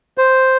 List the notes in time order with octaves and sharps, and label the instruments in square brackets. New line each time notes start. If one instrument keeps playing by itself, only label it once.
[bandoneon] C5